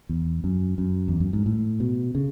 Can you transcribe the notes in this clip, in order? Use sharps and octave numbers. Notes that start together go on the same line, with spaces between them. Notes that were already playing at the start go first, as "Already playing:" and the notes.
E2
F#2
F#2
E2
F#2
G#2
A2
B2
C#3